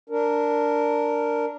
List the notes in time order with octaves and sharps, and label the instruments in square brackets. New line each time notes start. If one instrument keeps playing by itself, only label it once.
[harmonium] D4 A#4